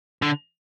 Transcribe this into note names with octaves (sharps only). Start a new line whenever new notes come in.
D3